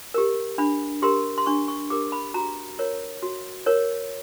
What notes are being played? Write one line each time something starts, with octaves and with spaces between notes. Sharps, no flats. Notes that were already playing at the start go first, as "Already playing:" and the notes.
G4 A#4
D4 B5
G4 A#4 C6
C6
D4 C#6
C#6
G4 A#4 D6
B5
F#4 A#5
A#4 C#5
F#4
A#4 C#5